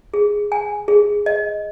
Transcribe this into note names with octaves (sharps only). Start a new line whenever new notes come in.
G#4
G#5
G#4
D#5